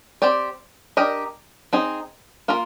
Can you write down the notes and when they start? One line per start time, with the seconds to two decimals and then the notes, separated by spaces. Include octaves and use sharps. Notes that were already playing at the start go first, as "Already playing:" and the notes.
0.22 C4 G4 D5
0.97 D4 G4 A#4 D#5
1.73 C4 D#4 G#4 D#5
2.48 A#3 F4 A#4